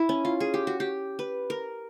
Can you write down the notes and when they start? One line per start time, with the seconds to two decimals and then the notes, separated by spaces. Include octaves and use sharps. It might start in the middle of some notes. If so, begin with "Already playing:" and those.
Already playing: E4
0.09 C#4
0.25 F4
0.40 G#4
0.54 G4
0.67 F#4
0.80 G4
1.19 B4
1.50 A#4